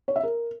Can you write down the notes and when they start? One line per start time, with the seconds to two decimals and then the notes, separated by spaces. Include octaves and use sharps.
0.08 C#5
0.16 E5
0.23 A#4